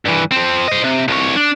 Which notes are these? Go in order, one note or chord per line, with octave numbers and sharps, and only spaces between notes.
G2 E3
F3 C4
C5 D#5
C3
C2 C#5
D4